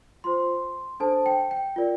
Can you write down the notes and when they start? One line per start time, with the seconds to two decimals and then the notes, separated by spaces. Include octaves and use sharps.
0.24 F4 C5 C6
1.00 D4 A4 C5 A5
1.26 G5
1.51 G5
1.76 F4 A#4 D5